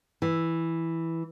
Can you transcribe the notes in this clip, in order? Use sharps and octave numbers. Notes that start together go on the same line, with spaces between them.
E3